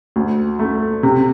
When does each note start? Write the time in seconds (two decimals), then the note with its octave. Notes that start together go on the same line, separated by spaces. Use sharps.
0.16 D2
0.59 A3
1.03 C3